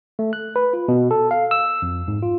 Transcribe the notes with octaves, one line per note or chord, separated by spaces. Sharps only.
A3
F#6
B4
F4
B2
A4
F5
E6
F2
G#2
F4